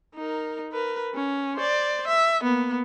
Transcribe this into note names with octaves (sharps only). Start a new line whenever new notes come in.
D#4 A#4
A#4 B4
C#4
C5 D5
E5
A#3 B3